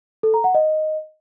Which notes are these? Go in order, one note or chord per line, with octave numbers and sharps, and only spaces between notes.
A4
A#5
F#5
D#5